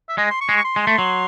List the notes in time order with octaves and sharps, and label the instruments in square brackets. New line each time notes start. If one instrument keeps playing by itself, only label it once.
[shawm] E5
[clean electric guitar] G#3 [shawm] D#5
[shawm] C6
C#6
[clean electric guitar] G#3
[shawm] C#6
C6
[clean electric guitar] G#3
A3
F#3